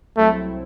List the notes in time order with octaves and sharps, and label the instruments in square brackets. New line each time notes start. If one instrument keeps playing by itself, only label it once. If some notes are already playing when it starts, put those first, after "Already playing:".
[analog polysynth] C2 C3 F#3 C4 E4 [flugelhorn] A3